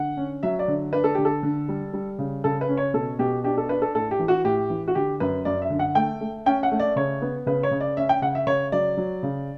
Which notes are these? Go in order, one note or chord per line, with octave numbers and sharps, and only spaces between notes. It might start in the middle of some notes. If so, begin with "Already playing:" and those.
Already playing: D3 F#5
C#4
F#3 E5
D5
D3
D4 B4
A4
D3 G4
A4
D3
G3
G3
C#3
C#3 A4
B4
C#4
C#5
B2 A4
B2 G4
D4 G4
A4
D4 B4
A4
A2 A4
G4
E3
F#4
A2 G4
E3
F#4
D3 G4
F#2 B4
F#2 D5
E5
D3
F#5
A3 G5
A3
C#4 G5
F#5
A3
D5
C#3 C#5
B3
C#3 B4
C#5
C#3
D5
C#4 E5
G5
C#3 F#5
E5
C#3 C#5
F#3 D5
F#3
C#3